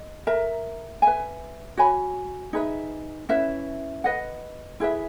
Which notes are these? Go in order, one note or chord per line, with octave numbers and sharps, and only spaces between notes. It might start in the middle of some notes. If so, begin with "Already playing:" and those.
Already playing: D#5
A#4 E5 A#5
B4 E5 G#5
F#4 C#5 G#5 B5
D#4 G#4 B4 E5
C#4 E4 B4 E5
B4 D#5 F#5
E4 G#4 B4 E5